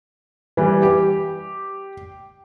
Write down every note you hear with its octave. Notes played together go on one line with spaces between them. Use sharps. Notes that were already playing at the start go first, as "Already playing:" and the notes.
E3 G3
G4